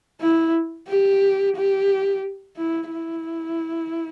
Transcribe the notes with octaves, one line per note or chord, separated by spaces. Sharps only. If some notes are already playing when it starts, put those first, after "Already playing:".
E4
G4
G4
E4
E4